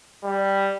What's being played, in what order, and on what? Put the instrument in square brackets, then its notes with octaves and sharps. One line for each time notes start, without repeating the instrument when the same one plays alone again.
[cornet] G3